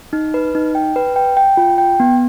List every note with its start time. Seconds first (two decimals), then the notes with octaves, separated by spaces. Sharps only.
0.13 D#4
0.34 B4
0.55 D#4
0.75 G5
0.96 B4
1.16 G5
1.37 G5
1.57 F4
1.78 G5
2.00 B3